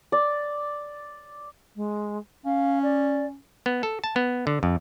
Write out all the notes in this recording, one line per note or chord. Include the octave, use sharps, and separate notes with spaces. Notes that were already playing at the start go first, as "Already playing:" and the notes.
D5
G#3
C#4 F5
D5
B3
A4
A5
B3
D3
F2